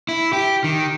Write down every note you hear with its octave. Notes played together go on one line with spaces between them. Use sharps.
E4
G4
D#3